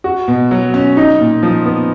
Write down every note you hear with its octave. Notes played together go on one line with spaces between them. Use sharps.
F#4
B2
F#3
C#4
D#4
A#2
F3
B3